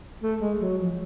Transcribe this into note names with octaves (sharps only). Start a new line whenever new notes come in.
A3
G#3
F#3
F3